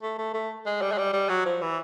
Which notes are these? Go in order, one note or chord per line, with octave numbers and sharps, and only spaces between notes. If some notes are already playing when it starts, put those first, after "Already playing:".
A3
A3
A3
G#3
G3
G#3
G3
G3
F#3
F3
E3